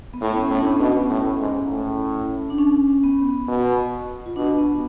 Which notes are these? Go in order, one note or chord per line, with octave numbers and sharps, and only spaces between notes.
B3
A2
C#4
A2
D4
B3
B2 C#4
A2
G#2
A2
D4
C#4
B3
B2
F4
B2 D4
B3